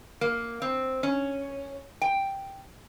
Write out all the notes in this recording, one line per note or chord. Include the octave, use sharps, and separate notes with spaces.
A#3
C4
C#4
G5